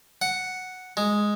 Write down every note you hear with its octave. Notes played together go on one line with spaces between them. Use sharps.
F#5
G#3